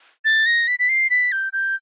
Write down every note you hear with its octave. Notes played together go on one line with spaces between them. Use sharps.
A6
A#6
B6
B6
C7
B6
G6
G6